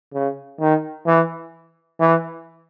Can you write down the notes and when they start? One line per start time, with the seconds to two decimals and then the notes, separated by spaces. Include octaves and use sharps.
0.14 C#3
0.60 D#3
1.07 E3
2.00 E3